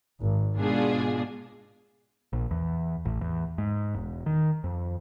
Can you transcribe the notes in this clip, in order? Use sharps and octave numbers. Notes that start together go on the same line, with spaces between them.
G#1
G#2 B2 D4 F4 G#4
A#1
E2
A1
E2
G#2
E1
D#3
F2